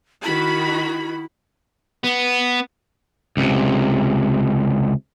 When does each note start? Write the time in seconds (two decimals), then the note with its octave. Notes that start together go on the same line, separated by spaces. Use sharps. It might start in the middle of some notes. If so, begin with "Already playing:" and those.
0.24 D#3 E4 F#4 B5
2.04 B3
3.37 C#2 C3